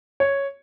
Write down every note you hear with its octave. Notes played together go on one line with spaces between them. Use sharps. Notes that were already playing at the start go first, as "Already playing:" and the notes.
C#5